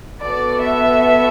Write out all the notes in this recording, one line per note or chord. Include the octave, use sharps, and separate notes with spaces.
B3 F#4 A4 D5
E5